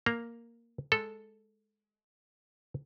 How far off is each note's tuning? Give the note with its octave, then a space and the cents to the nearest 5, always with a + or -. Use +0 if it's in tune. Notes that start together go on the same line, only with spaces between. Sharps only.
A#3 +0 A#5 +0
G#3 +0 A4 +0